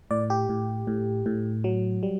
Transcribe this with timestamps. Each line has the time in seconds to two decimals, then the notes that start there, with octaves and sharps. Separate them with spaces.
0.11 A2 D5
0.30 G4
0.49 A2
0.87 A2
1.26 A2
1.64 F#3
2.03 G3